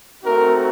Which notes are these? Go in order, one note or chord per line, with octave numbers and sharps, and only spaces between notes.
A3 C4 D#4 F#4 A#4